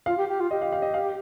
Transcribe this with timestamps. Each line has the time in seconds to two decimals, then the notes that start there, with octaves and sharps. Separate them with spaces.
0.06 F4 F5
0.17 G4
0.28 G4
0.39 F4
0.51 G4 D#5
0.62 F5
0.72 F5
0.82 D#5
0.94 F5